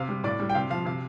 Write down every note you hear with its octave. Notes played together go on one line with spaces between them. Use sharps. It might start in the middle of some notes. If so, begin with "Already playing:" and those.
Already playing: C3 F5
G3
A2 D5
G3
G5
C3 F5
F3 F5
C3 F5